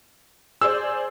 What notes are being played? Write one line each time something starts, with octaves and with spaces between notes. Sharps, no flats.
G#4 C5 D5 E6